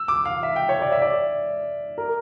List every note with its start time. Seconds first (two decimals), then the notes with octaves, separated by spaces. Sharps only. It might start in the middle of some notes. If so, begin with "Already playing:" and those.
Already playing: E6
0.08 D6
0.25 F5
0.43 E5
0.56 G5
0.69 C#5
0.81 D5
0.92 E5
1.02 D5
1.98 A#4